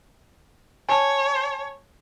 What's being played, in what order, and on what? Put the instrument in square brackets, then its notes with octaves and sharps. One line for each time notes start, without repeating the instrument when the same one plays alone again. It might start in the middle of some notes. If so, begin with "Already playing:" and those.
[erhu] C#5 [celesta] G#5 A5